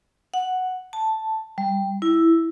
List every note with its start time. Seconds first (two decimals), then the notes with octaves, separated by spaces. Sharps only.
0.34 F#5
0.93 A5
1.58 G3
2.02 E4